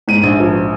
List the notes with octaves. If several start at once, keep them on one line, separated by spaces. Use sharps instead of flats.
G#2 D#7
A#1
F3